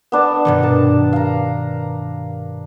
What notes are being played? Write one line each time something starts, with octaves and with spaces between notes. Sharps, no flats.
B3 D4 A5
G2 B2 D#3
A#4 A5
F5 A#5